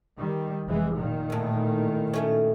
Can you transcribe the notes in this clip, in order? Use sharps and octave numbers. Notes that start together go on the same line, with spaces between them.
D#3 G3
F1 E3 G#3
A#2 D#3
E2 A2
F#2 A3 C#4